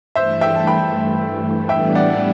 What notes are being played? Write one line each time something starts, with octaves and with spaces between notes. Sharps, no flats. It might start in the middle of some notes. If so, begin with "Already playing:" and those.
G2 E3 A3 C5 E5
E5 G5
A5
G5 B5
A2 E3 G3 B3 D4 E5 G5
D5 F#5